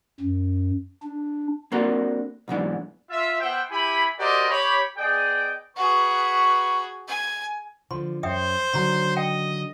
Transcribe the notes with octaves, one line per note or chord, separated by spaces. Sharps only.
F#2
D4
A#3 C4 D4 F#4 A4 A#4
B1 G#2 E3 D4
F4 E5
B3 C5 E5 F#5 G5
E4 G4 G#5 B5
F#4 G4 A#4 C5 D5 D#5
G4 C#5 B5
B3 G#4 D5 D#5 G5
F#4 G#4 B4 C#6
G#5
D3 F3 C6
F#2 C5 E5 G5 D#6
D3 D#3 F#3 A#5 C6
D#5 G5